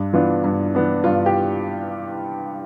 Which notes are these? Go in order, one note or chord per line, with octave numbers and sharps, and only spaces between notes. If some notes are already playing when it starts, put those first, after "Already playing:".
Already playing: G2
E3 B3 D4 F4
G2
E3 B3 D4
G2 F4
G4